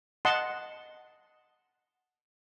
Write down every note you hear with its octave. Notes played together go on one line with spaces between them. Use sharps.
D#5 F#5 A5 C6